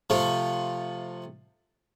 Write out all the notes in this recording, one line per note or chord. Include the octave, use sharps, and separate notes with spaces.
C3 F3 A3